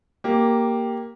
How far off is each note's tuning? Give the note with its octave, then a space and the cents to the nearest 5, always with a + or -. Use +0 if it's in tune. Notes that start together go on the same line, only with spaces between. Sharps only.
A#3 +0 G4 +0